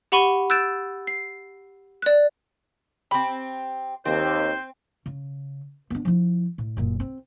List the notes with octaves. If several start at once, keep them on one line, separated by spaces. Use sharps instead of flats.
G4 F#5 B5 C#6 D#7 G7
E6 F#6 G6 A6 D7 E7
C7
D5 F#6
C4 G4 B5
D#2 C4 C5
C#3
B3 D4
F3 E4
A2
F#1 A#2
C4